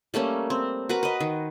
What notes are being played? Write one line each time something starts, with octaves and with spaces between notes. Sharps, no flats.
G3 A3 A#3 C#4
C4
F#4 A#4 B4 A#5
B4 D#5
D#3